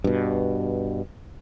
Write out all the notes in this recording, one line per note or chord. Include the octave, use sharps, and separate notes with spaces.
G2 B2